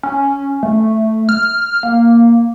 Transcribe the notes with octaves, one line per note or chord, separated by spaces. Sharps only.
C#4
A3
F6
A#3